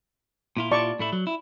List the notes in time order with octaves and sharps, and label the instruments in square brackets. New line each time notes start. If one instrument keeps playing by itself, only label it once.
[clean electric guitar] A#2 E4 F4
[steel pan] D5 A5 C#6
[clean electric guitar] A2 A3 E4
F#3
E4